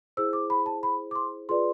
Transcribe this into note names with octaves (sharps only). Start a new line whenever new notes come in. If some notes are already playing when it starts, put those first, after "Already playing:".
E4 G#4 C5 E6
D6
B5
A5
B5
D6
C6
F4 G#4 B4 D5 C6